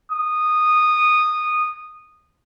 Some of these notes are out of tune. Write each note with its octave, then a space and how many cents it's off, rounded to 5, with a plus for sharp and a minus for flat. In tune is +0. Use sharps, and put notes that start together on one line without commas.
D#6 -15